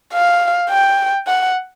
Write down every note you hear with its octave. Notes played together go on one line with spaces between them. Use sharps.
F5
G5
F#5